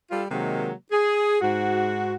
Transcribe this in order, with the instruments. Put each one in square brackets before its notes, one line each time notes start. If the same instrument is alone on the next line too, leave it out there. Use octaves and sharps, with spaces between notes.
[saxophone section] G3 F4 A4
C3 D#3 F#3 G#3 A#3
G#4
G#2 F#4